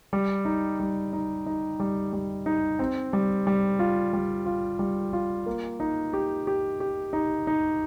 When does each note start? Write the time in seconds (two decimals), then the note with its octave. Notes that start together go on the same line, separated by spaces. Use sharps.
0.13 G3
0.45 D#4
0.80 G3
1.13 D#4
1.46 D#4
1.80 G3
2.13 G3
2.46 D#4
2.79 C4
3.13 G3
3.47 G3
3.79 F4
4.13 G3
4.46 F4
4.79 G3
5.13 F4
5.46 A#3
5.80 D#4
6.13 G4
6.47 G4
6.80 G4
7.13 D#4
7.47 D#4